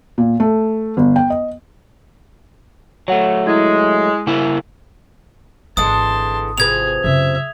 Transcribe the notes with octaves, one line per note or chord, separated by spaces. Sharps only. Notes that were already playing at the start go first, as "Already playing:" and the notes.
A#2
A3
G1
G5
D#5
F#3 A3 C#5 F#5
G#3 E4 G#6
C#3 A#3 E4
G#1 D3 E3 G#3 E4 A5 C6 D#6
C3 F3 G#4 B4 G#6 F7
F#2 C#3 E5